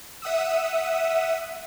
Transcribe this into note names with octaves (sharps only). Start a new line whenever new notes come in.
E5 F#5 D#6 E6